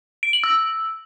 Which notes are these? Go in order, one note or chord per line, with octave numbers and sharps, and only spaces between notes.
D7
F#7
E6